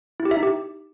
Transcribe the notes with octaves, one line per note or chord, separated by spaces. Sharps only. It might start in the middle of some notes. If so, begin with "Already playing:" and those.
E4
G4
E5
D#4
G4